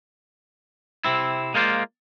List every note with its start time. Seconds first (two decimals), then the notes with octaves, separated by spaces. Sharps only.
1.05 C3 C4 E4
1.54 G#3 A#3 F4 C5 D5